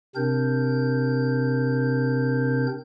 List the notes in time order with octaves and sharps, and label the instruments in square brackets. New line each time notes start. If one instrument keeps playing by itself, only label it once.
[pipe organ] C3 C4 D4 A#4 G6